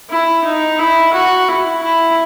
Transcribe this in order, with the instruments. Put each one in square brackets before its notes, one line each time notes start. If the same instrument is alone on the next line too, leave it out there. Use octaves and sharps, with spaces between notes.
[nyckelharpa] E4
D#4
E4
F#4
E4
E4